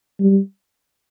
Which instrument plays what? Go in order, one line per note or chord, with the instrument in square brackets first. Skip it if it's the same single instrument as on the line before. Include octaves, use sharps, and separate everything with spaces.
[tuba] G3